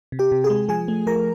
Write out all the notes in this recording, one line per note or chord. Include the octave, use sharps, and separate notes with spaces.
C3
G4 G5
C3
G#4 G#5
G#3
F3 G#4 G#5
A3
F3 A#4 A#5